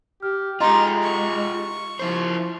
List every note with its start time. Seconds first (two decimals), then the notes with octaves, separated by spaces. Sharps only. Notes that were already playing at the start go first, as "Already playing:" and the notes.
0.23 G4 F6
0.60 G#3 D#4 F4 G4 D#5 A#5 C6
1.03 C#6
1.99 F3 E4 C5